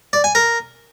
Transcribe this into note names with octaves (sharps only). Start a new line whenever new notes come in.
D5
G#5
A#4